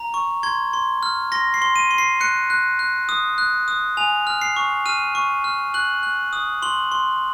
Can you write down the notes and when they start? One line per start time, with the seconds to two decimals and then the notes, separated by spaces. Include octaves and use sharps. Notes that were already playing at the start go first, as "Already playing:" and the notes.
Already playing: A#5
0.14 C#6
0.43 C6 G#6
0.73 C6
1.03 F6
1.32 C6 A#6
1.54 C7
1.62 C6
1.76 D#7
1.91 C6
1.98 C7
2.21 F#6 C#7
2.50 F#6
2.79 F#6
3.09 D#6
3.38 F#6
3.68 D#6
3.97 G#5 F7
4.27 F6
4.42 C7
4.56 C#6
4.86 F6 D#7
5.15 C#6
5.44 F6
5.74 F#6 F#7
6.03 F#6
6.33 D#6
6.62 C6 F#7
6.92 C6